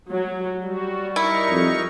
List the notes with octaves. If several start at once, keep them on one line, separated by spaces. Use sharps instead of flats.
F#3
G3 F#4
D#4 E4 A#4 C#6
F2